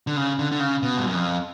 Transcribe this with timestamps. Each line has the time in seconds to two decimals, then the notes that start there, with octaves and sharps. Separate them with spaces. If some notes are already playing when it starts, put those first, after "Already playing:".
0.07 D3
0.17 C#3
0.39 D3
0.52 D3
0.60 C#3
0.83 B2
0.98 G2
1.06 F#2
1.15 F2